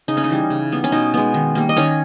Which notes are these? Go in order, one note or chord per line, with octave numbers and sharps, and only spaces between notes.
C#3 D#4
C#4
D#4
E3 G3
C#3
G3 B3
C#4
B2 D#4
G#3 B3
D#3
G3 A#3
D#5
D#3 C#4 C#5